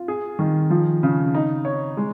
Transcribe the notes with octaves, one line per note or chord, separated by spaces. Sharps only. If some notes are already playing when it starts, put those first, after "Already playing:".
Already playing: F4
G#4
D#3
F3
C#3
D#4
C#5
G#3